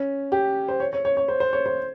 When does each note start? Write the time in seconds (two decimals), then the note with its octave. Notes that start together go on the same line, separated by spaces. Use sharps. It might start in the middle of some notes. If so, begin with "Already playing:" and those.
Already playing: C#4
0.32 G4
0.68 C5
0.80 C#5
0.93 C#5
1.05 C#5
1.17 C#5
1.28 C5
1.40 C5
1.53 C#5
1.66 C5